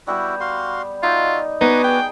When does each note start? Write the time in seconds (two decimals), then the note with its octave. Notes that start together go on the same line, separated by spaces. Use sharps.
0.07 G3 B3 E4 F#4 G4
0.40 F#4 F5 C6
1.03 D#4 F4 F#4 E5
1.61 B3 D#4 F#4 G#5 D6
1.84 G#4 G5